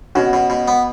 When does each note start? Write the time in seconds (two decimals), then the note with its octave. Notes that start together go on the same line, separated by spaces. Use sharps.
0.15 B2 C#4 F#4
0.33 B2
0.50 B2
0.68 B3